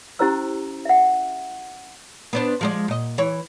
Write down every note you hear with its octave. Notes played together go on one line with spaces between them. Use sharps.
C#4 E4 G4 C5 A#5 E6
E5 F#5
B3 D4 C5
F3 G#3 D5
A#2 D#5
E3 C#5